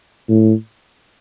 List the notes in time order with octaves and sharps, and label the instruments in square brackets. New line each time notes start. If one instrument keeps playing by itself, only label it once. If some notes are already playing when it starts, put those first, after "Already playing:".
[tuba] A2